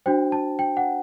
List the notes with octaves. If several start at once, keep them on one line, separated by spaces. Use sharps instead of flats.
D4 F#4 C5 G5
A5
G5
F#5